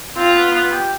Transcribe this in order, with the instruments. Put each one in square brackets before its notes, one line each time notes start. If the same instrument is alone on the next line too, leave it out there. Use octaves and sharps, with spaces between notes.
[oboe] C4 [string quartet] F4
[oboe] B3
B3
G4